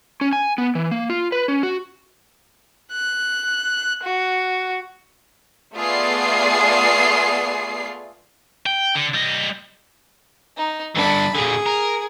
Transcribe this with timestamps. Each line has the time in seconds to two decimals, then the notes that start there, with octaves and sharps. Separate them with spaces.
0.21 C#4
0.33 G#5
0.58 B3
0.75 E3
0.91 A#3
1.10 F4
1.32 B4
1.48 C#4
1.63 F#4
2.92 F#6
4.03 F#4
5.75 A3 B3 F4 G#4 D5 C7
8.66 G5
8.96 D3
9.14 G3 D#5
10.57 D#4
10.96 G2 D3 D4 B5
11.35 A#2 D3 G#4
11.66 A#4